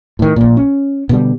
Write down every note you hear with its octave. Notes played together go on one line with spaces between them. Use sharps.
A2 D#3
A#1 A#2
C#4
B2 D3 G3